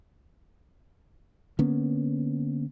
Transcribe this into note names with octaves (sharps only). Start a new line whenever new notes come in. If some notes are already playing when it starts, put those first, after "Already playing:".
D3 A#3 B3 C#4